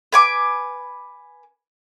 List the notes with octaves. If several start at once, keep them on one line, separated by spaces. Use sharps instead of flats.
B4 G#5 D6